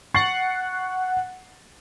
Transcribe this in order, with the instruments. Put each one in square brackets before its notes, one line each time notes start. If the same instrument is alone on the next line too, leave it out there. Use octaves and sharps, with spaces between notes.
[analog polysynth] F#5 [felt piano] C#6 A6 C7